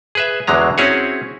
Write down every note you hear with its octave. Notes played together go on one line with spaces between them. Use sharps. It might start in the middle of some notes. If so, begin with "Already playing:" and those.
G#4 B4 E5
E2 D3 F#3 G#3 A#5
C4 C#4 E4 F#4 G#4 C#5